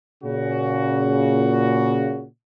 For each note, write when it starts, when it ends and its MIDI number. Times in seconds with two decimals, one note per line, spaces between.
0.23 2.25 46
0.23 2.25 49
0.23 2.25 66